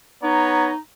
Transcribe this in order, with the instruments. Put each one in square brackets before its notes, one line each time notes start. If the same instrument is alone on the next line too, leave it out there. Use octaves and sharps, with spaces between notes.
[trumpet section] B3 C#5 A#5 [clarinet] D#4